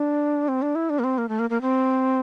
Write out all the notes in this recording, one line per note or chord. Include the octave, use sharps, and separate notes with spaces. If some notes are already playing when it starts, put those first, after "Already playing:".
Already playing: D4
C4
D4
E4
D4
A#3
C4
A#3
A3
A#3
A#3
C4